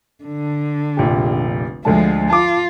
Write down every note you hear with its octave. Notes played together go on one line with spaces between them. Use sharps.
D3
F1 A#1 G4
D2 D3 F3 G#3 A5
F4 A5 D6